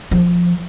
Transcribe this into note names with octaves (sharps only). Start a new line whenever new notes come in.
F3